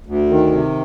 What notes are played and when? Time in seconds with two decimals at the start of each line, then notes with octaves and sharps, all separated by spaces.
0.06 D2
0.29 D#3
0.51 C3